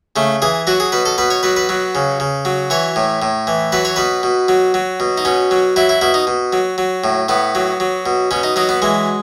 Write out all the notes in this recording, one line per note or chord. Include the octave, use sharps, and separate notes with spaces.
C#3 A3
E3 G#4
F#3 F#4
G#4
B2 B4
A4
B2 B4
C#5
F#3 B4
B4
F#3
C#3
C#3
F#3
E3 C#5
A2
A2
E3
F#3 B4
C#5
B2 B4
B2
F#3
F#3
B2
D#4
B2 C#4
F#3
F#3 E4
E4
B2 E4
D#4
B2
F#3
F#3
A2
A2 B3
F#3
F#3
B2
B2 C#4
D#4
F#3 D#4
B3
E3 G#3